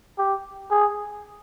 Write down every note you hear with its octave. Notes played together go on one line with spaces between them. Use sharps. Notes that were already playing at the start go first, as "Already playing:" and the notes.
G4
G#4